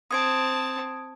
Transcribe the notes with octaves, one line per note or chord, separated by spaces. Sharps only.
C4 A5 D#6 G#6 D7